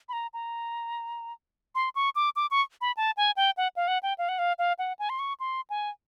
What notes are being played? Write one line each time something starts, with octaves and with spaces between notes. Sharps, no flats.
B5
A#5
A#5
C6
C#6
D6
D6
C#6
B5
A5
G#5
G5
F#5
F5
F#5
G5
F5
F#5
F5
F5
F#5
G#5
C6
C#6
C6
G#5